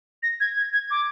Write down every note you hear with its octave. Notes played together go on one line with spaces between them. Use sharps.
A#6
G#6
G#6
G#6
D6